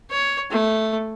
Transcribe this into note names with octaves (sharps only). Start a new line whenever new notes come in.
C#5
A3